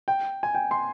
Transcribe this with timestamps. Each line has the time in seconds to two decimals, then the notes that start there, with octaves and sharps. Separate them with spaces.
0.08 G5
0.43 G#5
0.55 G5
0.71 C6